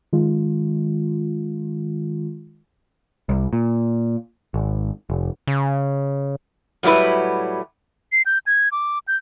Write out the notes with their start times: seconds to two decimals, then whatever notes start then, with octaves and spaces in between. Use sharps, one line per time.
0.13 D#3 G#3 F4
3.29 C2
3.53 A#2
4.54 G#1
5.10 F1
5.47 C#3
6.83 A2 F#3 G3 E4 B4
8.12 C7
8.26 G6
8.46 G#6
8.72 D6
9.08 G6